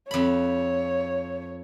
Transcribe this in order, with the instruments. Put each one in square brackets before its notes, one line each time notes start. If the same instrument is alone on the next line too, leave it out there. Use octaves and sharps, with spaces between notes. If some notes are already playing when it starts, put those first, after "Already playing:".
[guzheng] F2 B5 [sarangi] C#5